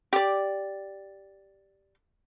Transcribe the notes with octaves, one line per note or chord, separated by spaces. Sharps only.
G4 D5